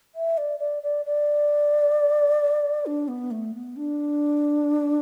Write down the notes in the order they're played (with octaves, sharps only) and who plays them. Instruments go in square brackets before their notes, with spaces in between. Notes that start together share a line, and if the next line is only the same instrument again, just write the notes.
[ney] E5
D5
D5
D5
D5
D4
B3
A3
B3
D4